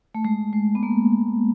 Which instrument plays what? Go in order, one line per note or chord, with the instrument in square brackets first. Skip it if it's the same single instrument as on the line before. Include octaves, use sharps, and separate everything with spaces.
[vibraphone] A3
G#3
G#3
B3
A#3